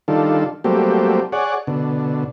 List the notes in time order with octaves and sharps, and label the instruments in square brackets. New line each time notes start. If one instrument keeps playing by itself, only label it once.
[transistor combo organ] D#3 G3 D4 F4 A4
F#3 G3 A3 A#3 C4 G4
G#4 C#5 D5 F#5
B2 D3